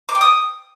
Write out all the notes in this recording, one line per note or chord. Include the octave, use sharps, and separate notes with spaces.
D6
G5
D#6